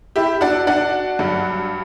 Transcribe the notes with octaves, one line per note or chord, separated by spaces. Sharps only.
E4 G4
D4 F#4
D4 F#4
G2 F#3